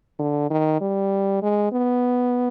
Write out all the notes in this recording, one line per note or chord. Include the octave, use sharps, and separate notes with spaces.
D3
D#3
G3
G#3
B3